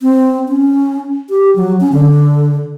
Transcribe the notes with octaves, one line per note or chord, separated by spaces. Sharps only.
C4
C#4
G4
F#3
C#4
D3